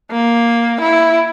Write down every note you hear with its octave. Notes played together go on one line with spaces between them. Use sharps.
A#3
E4